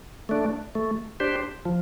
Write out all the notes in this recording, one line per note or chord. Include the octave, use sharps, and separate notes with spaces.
A3 D4
A3
D4 G4 C5
F3